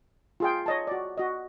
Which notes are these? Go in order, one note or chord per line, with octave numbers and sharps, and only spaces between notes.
F4 G#4 G5
C#5 D#5 A5
F#4 D5
F#4 D#5